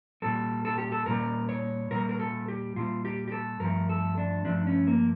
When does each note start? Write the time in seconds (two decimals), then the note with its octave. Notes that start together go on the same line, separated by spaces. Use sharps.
0.22 A#2 G3 A4
0.65 A4
0.78 G4
0.92 A4
1.06 A#2 G3 A#4
1.49 C#5
1.91 A#2 G3 A#4
2.09 A#4
2.19 A4
2.48 G4
2.76 A#2 G3 F4
3.05 G4
3.28 G4
3.32 A4
3.60 G2 F3 A3 A#4
3.89 A4
4.18 D4
4.45 G2 F3 A3 D4
4.67 C#4
4.87 A#3